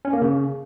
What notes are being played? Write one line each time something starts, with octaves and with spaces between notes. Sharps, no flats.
C#4
A#3
C#3